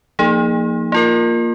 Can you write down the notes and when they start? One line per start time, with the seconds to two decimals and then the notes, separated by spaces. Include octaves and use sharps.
0.19 F3 A#3 D#4 G#4
0.92 A#3 F4 A#4